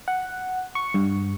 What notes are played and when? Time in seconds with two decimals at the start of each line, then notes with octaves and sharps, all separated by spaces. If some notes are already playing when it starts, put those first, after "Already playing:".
0.08 F#5
0.75 C#6
0.94 G2